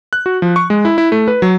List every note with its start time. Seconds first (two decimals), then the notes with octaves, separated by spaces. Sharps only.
0.13 F#6
0.26 F#4
0.42 F3
0.56 C#6
0.70 G#3
0.85 E4
0.98 E4
1.12 A3
1.28 B4
1.42 F#3